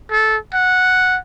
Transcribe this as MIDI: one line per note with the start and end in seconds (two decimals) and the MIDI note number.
0.11 0.37 69
0.54 1.18 78